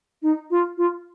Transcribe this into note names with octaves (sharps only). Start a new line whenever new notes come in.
D#4
F4
F4